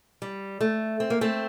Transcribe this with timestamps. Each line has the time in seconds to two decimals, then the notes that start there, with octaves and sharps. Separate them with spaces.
0.22 G3
0.61 A3
1.00 C4
1.10 A#3
1.21 A3 C4